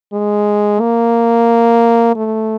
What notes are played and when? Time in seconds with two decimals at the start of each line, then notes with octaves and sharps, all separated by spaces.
0.13 G#3
0.80 A#3
2.16 A3